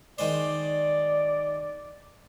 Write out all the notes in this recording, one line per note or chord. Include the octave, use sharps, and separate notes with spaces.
D#3 G#3 C5 D5